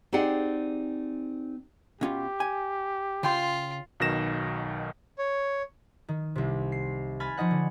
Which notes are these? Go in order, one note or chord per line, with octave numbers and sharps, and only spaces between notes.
C4 D#4 G4 G#4 D5 F#5
B2 C#4 F4 G4
G#5
C#3 F4 G5 C6
B1 B2 D#3 A#6 E7
C#5
D#3
C2 C3
C7
G#5 B5 F6 A6
F3 D#4 D#5 F#5
D3